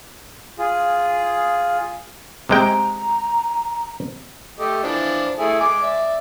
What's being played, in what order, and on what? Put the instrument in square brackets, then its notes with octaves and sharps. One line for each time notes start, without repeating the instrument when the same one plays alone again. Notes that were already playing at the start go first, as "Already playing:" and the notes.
[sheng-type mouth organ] F4 G#4
[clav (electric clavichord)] C3 G#3 G5 [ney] A#5
[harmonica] A3 G4 D#5
E3 F3 D4
A3 E4 G#4
G#3 D6
D5 E5